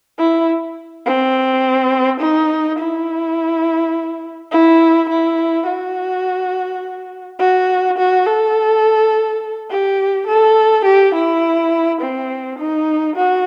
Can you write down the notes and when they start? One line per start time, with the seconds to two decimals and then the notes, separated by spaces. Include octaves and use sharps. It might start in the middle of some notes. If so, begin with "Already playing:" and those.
0.19 E4
1.06 C4
2.20 D#4
2.79 E4
4.52 E4
5.09 E4
5.67 F#4
7.39 F#4
7.98 F#4
8.27 A4
9.70 G4
10.27 A4
10.85 G4
11.14 E4
12.01 C4
12.58 D#4
13.16 F#4